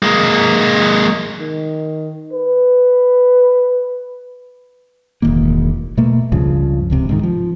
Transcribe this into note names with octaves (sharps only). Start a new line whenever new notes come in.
G#3 A#3
D#3
B4
E1 A1 D#3 A#3
B2 A3 A#3
C#2 G2 C#3 F3
D1 C#2 C3
G#2 C3 D#3
F3